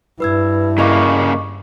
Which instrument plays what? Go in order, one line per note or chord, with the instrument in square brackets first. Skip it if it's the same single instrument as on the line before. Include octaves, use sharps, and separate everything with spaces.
[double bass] G2 [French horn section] E4 [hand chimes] B4 E6 G#6
[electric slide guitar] C#3 A#3 [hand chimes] D#5 C#6 D6